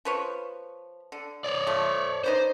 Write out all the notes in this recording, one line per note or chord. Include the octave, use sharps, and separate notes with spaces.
F3 B4 C#5
D3
C#5 D5
A3 F4
D#4 B4 C5 D5